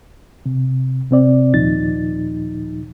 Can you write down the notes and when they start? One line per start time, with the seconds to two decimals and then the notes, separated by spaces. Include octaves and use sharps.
0.46 C3
1.11 C3 C4 D5
1.54 D#2 A#2 F3 D#4 A6